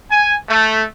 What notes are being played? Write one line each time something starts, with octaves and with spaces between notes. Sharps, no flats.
G#5
A3